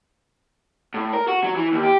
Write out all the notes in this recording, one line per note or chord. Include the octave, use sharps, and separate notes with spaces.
A2
A#4
F#4
F#3
E3
D#2
G4